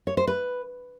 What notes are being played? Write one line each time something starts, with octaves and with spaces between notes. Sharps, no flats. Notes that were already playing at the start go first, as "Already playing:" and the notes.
C#5
C5
B4